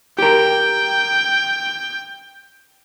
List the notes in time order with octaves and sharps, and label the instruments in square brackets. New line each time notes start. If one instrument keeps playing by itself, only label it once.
[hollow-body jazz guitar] G4 A#4 [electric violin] G5